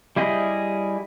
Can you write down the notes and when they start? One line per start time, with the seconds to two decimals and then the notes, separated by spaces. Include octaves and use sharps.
0.16 G3 E4 G#4 D#5